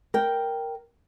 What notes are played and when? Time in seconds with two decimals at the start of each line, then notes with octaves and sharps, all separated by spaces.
0.14 A#4 G5